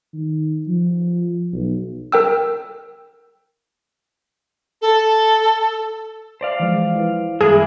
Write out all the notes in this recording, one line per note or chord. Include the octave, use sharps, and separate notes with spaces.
D#3
F3
B1
A#4 G5 E6
A4
C5 D5 F5
E3 F3 G#3
E4 B4
F#2 D#3 G3 G#3 A#3 E4 G#4